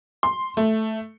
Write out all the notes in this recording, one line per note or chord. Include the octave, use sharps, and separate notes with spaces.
C6
A3